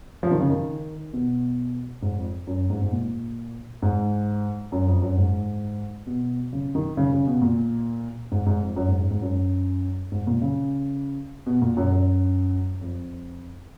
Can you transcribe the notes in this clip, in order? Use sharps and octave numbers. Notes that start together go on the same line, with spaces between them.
F3
D#3
C#3
D#3
B2
G#2
F2
F#2
G#2
G#2
A#2
G#2
F#2
F2
F#2
G#2
B2
C#3
D#3
C#3
C#3
B2
A#2
G#2
G#2
F2
F#2
G#2
G#2
G#2
F#2
G#2
A#2
C#3
B2
A#2
F#2
F#2
F2